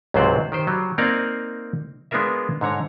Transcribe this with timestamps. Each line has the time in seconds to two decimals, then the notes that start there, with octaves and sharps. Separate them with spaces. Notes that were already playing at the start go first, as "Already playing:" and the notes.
0.14 C#2 G#2 C3 F#3 C5 D5
0.52 D#3 G4 C5
0.67 F#3 G3
0.98 A#3 C4 D#4 A#4 D5 F5
2.11 G#3 B3 D4 F4 A#4 E5
2.61 G#2 D3 C#5 A#5